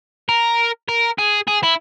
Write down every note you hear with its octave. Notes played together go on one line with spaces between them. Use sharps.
A#4
A#4
G#4
G#4
E4